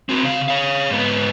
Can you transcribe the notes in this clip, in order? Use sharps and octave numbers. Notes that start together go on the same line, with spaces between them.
C4 F#4
C#3 F5
C#5 F5
G#2 B3